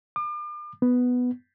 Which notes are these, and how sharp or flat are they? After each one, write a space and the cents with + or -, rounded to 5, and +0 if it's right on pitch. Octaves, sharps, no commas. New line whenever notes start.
D6 +40
B3 +5